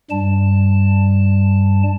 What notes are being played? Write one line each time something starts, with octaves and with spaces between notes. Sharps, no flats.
G2 G3 A5